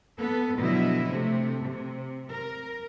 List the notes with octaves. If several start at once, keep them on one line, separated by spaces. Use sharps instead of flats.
B3 A4 B4
B2 D3 F3 F#3 E4 D#5
C3 A3
C3
A#4